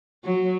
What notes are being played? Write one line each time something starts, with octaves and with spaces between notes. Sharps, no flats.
F#3